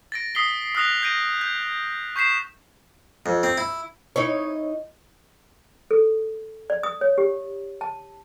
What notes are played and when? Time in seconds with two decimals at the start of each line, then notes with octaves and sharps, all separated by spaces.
0.12 A6 A#6 D7
0.35 D#6 B6 C7 G7
0.75 D#6 F6 F#6 A#6 C7 F7
1.03 G6 A#6 D7 D#7
1.41 G6
2.16 C#6 G6 B6 C7 E7
3.26 F2
3.43 C4
3.58 E4
4.16 D#4 E4 C#5
5.91 A4
6.70 D5
6.83 D#6
7.01 C#5
7.18 G4
7.81 A5